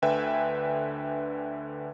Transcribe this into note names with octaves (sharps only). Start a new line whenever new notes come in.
D2 D3 B4 E5 G5 G#5